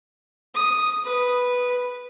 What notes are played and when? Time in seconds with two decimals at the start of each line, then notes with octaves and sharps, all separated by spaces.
0.55 D#6
1.05 B4